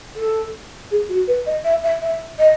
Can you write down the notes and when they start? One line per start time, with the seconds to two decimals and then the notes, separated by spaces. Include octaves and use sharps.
0.16 A4
0.91 G#4
1.09 F#4
1.28 B4
1.46 D#5
1.65 E5
1.83 E5
2.02 E5
2.39 D#5